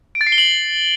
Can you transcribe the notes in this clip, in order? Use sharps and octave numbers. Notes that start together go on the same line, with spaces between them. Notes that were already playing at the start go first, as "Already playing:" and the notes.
D7
A6
C7
G7
F#7